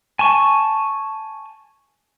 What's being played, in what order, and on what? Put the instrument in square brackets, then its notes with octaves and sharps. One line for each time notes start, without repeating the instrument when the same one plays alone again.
[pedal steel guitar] G#5 A5 C#6